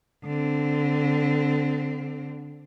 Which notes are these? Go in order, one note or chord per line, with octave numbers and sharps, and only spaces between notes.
D3 C4